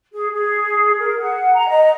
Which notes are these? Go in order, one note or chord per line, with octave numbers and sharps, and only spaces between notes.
G#4
G#4
A#4
F#5
A#5
D#5